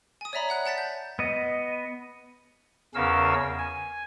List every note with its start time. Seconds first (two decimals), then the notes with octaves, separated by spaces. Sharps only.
0.21 G#5 D#6
0.33 C#5 D5 E5 A#5 B5
0.49 C#5 F#5 F#6
0.65 F#5 A5 A6 B6
0.78 G6
1.19 B3 D#5
2.95 E2 C#3 C#4 A#4 F5 E6
3.58 G#5